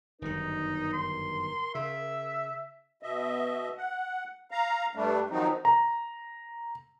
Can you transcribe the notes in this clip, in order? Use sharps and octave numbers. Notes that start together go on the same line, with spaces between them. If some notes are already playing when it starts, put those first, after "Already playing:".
G1 F#2 D#3 D#4 A#4
C6
C#3 E5
B2 D#5 E5
F#5
F5 A#5
G2 G3 A3 D4
D#3 F3 F#3 C4 D#4
A#5